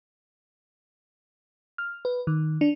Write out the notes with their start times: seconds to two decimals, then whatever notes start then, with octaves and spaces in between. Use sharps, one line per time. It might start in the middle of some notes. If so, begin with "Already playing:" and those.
1.78 F6
2.05 B4
2.27 D#3
2.61 D4